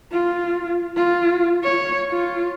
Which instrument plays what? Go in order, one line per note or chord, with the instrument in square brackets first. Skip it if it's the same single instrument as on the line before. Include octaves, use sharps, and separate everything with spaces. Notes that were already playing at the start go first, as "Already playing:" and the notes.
[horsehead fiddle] F4
F4
C#5
F4